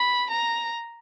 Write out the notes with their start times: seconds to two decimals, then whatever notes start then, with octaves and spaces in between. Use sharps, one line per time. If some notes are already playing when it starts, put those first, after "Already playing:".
Already playing: B5
0.31 A#5